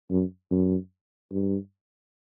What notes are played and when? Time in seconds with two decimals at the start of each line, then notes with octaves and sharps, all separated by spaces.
0.11 F#2
0.51 F#2
1.32 G2